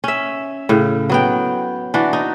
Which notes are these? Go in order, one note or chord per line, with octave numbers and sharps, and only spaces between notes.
C#4 E5
A2 C#3
F#3 B3 G5
E3 D4 F#4
D#4